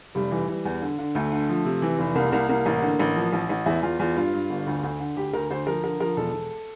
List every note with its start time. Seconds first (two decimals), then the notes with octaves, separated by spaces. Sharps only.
0.15 F1 G3
0.31 E3
0.48 E3
0.65 E2
0.82 D3
0.99 D3
1.15 D2 A3
1.32 D3
1.49 F3
1.65 C3
1.82 E3
1.99 F1
2.15 C2 A#3
2.32 C2 A#3
2.49 C2 A#3
2.66 A1
2.82 D3
2.99 A1
3.16 F3
3.32 A1
3.49 A1
3.66 E2 E4
3.83 E2 F4
3.99 E2 F4
4.16 G2 F4
4.33 G2
4.50 G1
4.66 D2
4.83 D2
5.00 D3
5.16 D2 G4
5.33 D2 A#4
5.50 D2 C5
5.67 F3 A#4
5.83 D3 A#4
6.00 F3 A#4
6.17 E1 A4
6.34 E1